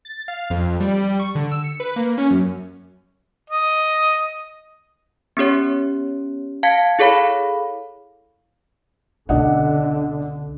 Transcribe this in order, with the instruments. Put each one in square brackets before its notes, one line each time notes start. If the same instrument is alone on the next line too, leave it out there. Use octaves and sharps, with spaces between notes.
[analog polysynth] A6
F5
F2
G3
C#6
D3
E6
C#7
B4
A#3
C#4
F#2
[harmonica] D#5
[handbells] B3 C#4 G4 C#5
F5 A5 G#6 B6 C#7
E4 G#4 A4 C#5 F5 B5
[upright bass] C#2 B2 [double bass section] D3 [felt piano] D4 D#5 F#5